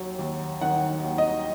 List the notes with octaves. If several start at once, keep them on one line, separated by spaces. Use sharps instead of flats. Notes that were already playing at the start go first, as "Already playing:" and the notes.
Already playing: D#2 F#3
D#2
D#3 F#5
D#2
D#5